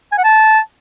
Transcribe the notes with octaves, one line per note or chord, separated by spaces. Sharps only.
G#5
F#5
A5